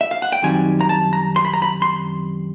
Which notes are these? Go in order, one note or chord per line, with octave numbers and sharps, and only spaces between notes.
E5
F5
F#5
G5
F#2 D#3 G3 C4 D#4 G#5
A#5
A5
A#5
C6
B5
A#5
B5
C6